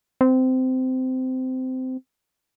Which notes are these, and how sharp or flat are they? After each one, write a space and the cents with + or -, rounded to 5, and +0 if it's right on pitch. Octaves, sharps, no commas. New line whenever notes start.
C4 -20